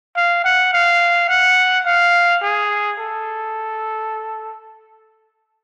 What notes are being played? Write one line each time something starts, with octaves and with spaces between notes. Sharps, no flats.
F5
F#5
F5
F#5
F5
G#4
A4